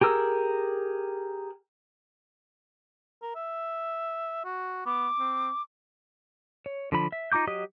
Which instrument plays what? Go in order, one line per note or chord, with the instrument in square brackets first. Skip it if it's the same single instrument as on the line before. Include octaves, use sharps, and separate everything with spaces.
[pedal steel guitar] G4 G#4 A#4 E6
[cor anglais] A#4
E5
F#4
[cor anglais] B3 [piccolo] D6
[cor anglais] C4
[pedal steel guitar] C#5
D3 F3 B5
E5
D#4 F4 A#5 D6 G6
F#3 G4 D#5 D#6